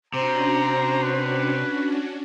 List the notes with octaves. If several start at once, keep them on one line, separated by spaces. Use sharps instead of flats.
C3 C#4 D4 F#4 C5 A#5
B4